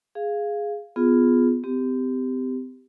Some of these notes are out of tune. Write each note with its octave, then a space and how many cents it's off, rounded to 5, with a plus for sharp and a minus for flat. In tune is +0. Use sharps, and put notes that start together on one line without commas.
G#4 +0 F5 -5
B3 +15 F4 +0 G#4 +0
C4 -40 G4 +0